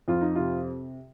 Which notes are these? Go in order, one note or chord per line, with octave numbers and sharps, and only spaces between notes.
F2 F4
D#4
C3 F4